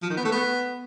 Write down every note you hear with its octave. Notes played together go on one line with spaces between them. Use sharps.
F3
D#3
B3
A3
B3